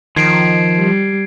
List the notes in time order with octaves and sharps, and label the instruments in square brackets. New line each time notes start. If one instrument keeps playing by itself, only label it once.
[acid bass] D#3 [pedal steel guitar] F3 [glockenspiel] G#6 C7 D7
[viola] G3